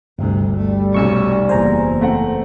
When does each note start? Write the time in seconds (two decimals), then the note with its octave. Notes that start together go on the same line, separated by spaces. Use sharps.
0.19 G1 D2 G2 C3
0.56 G3 A3
0.94 F1 B1 C#4 C#6 E6 C#7
1.49 F#1 E2 C5 G#5 A#5
2.01 A3 C4 F#5